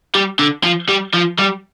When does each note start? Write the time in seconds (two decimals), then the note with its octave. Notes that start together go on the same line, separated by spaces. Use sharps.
0.15 G3
0.39 D3
0.63 F3
0.89 G3
1.14 F3
1.39 G3